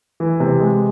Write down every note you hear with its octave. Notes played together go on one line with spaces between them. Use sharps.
E3
C3
G#3